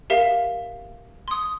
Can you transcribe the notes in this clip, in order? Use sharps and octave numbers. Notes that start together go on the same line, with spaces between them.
G4 A#4 E5 F5 E7
C6 D#6